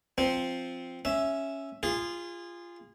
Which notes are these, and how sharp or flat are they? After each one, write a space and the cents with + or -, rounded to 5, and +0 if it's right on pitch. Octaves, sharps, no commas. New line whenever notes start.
F3 +0 C4 +0
C#4 +0 E5 +0
F4 -15 G#4 -30